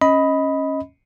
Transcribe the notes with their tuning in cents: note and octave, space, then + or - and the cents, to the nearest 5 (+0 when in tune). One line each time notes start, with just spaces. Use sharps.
C#4 -15 D#5 +15 B5 +0